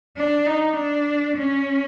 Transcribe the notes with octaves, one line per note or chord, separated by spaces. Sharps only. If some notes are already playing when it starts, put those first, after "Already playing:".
D4
D#4
D4
C#4